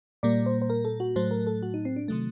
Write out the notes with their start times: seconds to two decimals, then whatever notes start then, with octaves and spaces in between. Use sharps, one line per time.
0.23 A#2 G3 A#3 D5
0.46 C5
0.62 C5
0.70 A#4
0.85 A4
1.00 F#4
1.16 A2 F#3 A3 C5
1.31 A#4
1.47 A4
1.63 F#4
1.74 D#4
1.85 C4
1.96 D4
2.08 C3 D#3 F#3 A3